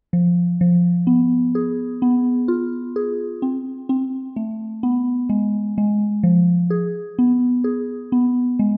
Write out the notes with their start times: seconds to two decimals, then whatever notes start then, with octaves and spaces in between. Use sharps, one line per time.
0.13 F3
0.61 F3
1.07 B3
1.55 G#4
2.02 B3
2.48 F4
2.96 G#4
3.42 C4
3.89 C4
4.36 A3
4.83 B3
5.30 G#3
5.78 G#3
6.23 F3
6.70 G#4
7.19 B3
7.64 G#4
8.12 B3
8.59 G#3